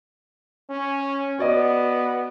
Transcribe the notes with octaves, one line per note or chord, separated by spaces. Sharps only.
C#4
B3 F#4 D5 D#5